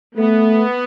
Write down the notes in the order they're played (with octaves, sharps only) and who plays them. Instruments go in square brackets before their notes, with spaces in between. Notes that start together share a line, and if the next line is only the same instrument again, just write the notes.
[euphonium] A3 [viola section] B3